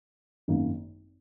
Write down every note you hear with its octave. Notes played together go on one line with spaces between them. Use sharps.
G#1 F#2 D#3 A#3